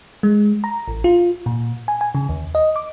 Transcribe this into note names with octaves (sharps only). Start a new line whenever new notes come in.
G#3
A#5
A1
F4
A#2
G#5
G#5
C#3
D#2
D#5
D6